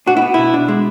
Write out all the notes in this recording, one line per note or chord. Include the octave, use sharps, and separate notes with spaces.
D4 F#4
E4
B3
B2 E4
D4
G#3